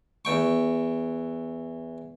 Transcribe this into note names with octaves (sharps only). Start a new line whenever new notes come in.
E2 G5 C#6